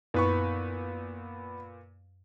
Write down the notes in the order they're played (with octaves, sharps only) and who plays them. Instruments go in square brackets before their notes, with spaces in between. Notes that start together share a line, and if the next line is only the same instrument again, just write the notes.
[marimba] F#2 [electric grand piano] A#2 B4 C#6 [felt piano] B3